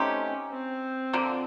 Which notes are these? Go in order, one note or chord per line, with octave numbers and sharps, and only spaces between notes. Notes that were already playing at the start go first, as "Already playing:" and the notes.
Already playing: A3 C4 C#4 D#4 G4
C4
D3 F3 A#3